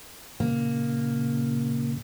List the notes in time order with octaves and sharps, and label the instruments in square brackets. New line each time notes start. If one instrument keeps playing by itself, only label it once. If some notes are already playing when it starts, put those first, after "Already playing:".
[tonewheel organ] A#2 C#3 [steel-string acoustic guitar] A#3